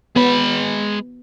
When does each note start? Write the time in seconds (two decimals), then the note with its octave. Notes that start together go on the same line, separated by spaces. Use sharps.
0.16 G#3 B3 B5